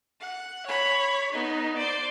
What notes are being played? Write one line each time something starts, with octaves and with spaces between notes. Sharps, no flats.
F#5
C#5 B5
B3 D#4
C5 D5